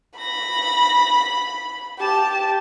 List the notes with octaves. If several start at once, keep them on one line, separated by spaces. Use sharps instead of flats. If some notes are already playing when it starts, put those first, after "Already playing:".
B5 A#6
G4 A5